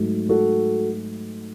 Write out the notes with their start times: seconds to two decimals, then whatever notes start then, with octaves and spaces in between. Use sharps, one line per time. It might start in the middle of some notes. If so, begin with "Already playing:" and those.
Already playing: G#2 F#3 A3
0.29 F#4 A4